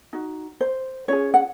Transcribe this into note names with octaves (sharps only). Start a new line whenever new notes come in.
D#4 F#4
C5
C#4 F4 G#4 C#5
F#5